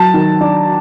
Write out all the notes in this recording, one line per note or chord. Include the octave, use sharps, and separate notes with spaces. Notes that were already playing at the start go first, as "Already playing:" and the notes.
Already playing: F#3 A5
D#3
D4